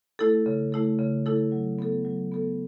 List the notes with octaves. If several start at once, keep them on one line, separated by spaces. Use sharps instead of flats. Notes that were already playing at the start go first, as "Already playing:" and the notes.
A3 E4 A4
C#3
A3 E4 A4
C#3
A3 E4 A4
F#3
B3 A4
F#3
B3 A4